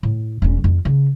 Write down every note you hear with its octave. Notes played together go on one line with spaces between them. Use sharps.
A2
E1 C#4
F2
C#3